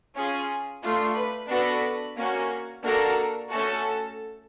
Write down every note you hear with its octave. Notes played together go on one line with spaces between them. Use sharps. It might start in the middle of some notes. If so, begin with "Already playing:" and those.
C#4 F4 G#4
A3 D4 F4
B4 B5
B3 D4 F#4 A4 B4 B5
A#3 C#4 F#4
A#3 D4 F#4 A4 A#4 A#5
A3 C#4 F#4 A4 A5